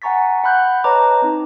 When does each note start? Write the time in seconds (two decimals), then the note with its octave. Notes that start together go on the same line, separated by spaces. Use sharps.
0.02 F#5 G#5 A#5 C#6 A6 B6
0.44 F#5 B5 F#6 G6
0.84 B4 C#5 D#5 A5 A#5 D6
1.22 C4 D#4